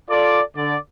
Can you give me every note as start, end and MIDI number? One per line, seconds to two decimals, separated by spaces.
0.10 0.41 65
0.10 0.41 69
0.10 0.41 74
0.56 0.76 50
0.56 0.76 74